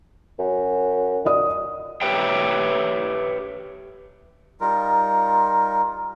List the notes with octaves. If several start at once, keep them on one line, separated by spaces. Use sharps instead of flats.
F#2
D5 D#5 D#6
G4 B4 C#5 E5 G5
G3 D#4 F4 A#4